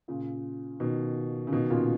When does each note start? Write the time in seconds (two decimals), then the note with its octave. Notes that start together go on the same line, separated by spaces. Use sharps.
0.08 A#2 C#3
0.80 B2 D#3
1.47 C#3
1.52 B2 D#3
1.70 A#2 C#3